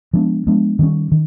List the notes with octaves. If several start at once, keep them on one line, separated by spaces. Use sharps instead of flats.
F3 G#3 B3 D4
F3 G#3 B3 D4
D#3 G3 A#3 C#4
D#3